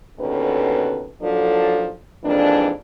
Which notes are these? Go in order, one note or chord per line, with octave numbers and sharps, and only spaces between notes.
D#2 B2 D3 C#4 A4 B4
D#2 F3 F#3 D4 A4
F2 G#2 E3 A#3 D4